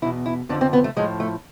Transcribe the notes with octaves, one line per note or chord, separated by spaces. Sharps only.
E2 B2 E4
E4
F2 D3 F3 D4
C4
B3
A3
A2 F3 G#3
A3